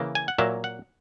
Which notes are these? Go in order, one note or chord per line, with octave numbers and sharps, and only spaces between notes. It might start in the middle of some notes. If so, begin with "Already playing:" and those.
Already playing: C#3 E3 A#3
G#5
F#5
A#2 F#3 A#3 E5
F#5